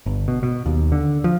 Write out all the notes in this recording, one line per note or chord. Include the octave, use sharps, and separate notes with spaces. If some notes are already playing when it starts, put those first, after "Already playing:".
G1
B2
B2
D#2
D3
F3